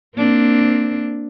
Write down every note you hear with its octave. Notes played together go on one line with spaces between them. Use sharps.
A#3 C4 D4